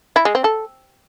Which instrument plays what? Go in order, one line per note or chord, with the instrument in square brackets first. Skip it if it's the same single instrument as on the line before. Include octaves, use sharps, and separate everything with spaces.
[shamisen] E4
G#3
C4
A4